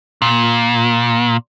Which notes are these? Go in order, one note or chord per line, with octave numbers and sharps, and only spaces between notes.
A#2